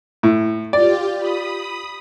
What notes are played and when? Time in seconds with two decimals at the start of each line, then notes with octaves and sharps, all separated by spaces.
0.23 A2
0.73 F4 G4 D5
1.17 B5 D#6